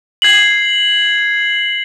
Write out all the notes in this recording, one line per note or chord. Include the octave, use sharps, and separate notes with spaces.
G#6 C7 F#7